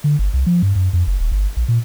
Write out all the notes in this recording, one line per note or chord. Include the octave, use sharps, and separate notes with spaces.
D3
G1
C2
F3
G2
F#2
F2
F#1
D#1
G1
A#1
A#2